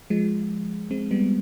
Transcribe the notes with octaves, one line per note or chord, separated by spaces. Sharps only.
F3 G#3
G#3 C4
G3 B3